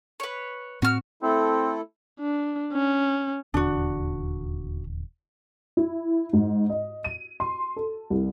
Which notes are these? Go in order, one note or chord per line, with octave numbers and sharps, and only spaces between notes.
B4 C#5
A2 C4 F#4 F6
A3 C4 E4 A4
D4
C#4
D#1 E2 D3 D4 F#4
E4
G#2
D#5
D#7
C6
A4
C2